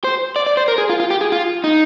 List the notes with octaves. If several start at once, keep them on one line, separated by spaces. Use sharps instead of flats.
C5
D5
D5
C5
A#4
G#4
F4
F4
G4
G#4
F4
D#4